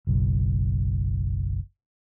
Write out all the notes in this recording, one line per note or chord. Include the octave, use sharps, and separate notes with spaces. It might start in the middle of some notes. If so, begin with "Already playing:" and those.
F#1 B1